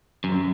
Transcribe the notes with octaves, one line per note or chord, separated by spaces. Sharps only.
F#2